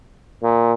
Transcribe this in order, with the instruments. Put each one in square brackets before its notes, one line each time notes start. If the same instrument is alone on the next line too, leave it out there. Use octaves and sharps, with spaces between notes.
[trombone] A#2